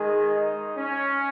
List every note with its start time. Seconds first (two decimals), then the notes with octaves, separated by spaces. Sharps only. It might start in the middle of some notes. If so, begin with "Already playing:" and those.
Already playing: D#3 G#3 G#4
0.32 D#4
0.78 C#4